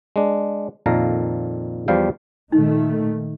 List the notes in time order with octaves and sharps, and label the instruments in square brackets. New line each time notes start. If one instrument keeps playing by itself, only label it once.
[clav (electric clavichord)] G#3 D4
F2 A#2 D#3 A4 F5 A#5
E2 F3 G3 F5 G5
[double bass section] A#2 D#3 A3 [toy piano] D#4